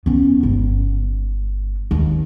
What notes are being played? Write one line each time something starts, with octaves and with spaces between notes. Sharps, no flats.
B3 C#4
G1
D#2